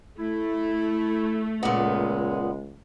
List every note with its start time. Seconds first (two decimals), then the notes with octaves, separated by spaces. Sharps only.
0.19 A3 E4
1.63 C#2 A#2 G#3 B3